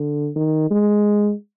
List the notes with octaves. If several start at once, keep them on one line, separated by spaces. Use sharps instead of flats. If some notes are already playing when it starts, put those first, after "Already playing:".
Already playing: D3
D#3
G#3